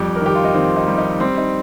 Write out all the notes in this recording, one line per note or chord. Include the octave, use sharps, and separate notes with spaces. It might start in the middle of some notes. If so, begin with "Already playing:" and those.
Already playing: F2 G3 G4
A#4
D#3 G4
F4
D#4
D#3 C4
D#4
G3
D#4
G3 C4
D#4